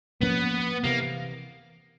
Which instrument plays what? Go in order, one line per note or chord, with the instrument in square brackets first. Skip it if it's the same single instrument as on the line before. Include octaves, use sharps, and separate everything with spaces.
[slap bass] G#2 F3 A#3 C#4 [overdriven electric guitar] B3
[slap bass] C3 E3 [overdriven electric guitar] A#3